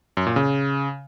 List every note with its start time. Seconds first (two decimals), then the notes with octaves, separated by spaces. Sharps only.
0.17 F#2
0.27 A#2
0.36 C#3